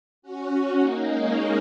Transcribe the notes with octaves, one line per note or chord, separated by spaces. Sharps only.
C#4 F#4
A#3 D#4
G#3 C#4